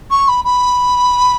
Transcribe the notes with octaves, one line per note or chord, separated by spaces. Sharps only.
C#6
B5
B5